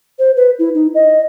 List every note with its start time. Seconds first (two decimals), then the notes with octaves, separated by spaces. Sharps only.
0.19 C5
0.36 B4
0.59 E4
0.75 D#4
0.95 D#5